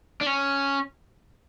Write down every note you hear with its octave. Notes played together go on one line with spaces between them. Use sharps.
D4
C#4